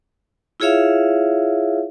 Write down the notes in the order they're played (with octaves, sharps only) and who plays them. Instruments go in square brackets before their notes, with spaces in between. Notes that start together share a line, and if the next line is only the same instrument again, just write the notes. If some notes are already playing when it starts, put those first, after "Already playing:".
[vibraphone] E4 F4 G#4 C#5 E5 F5